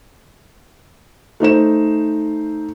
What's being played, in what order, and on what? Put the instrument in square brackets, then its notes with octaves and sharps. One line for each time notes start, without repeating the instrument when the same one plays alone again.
[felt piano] A3 D#4 C5 E7